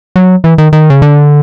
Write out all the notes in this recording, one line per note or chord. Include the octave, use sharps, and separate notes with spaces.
F#3
E3
D#3
D#3
C#3
D3